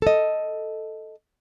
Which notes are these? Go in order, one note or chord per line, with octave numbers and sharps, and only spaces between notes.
A4 D#5